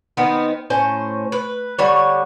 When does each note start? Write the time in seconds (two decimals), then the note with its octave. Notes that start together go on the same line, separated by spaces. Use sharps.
0.17 D#3 B3 C4
0.70 A2 C#4 C5
1.32 B4
1.78 D3 G3 C#5